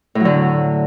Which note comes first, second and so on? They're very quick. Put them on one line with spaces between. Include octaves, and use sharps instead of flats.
A2 F#3 D3